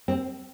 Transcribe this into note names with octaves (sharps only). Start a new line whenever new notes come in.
C4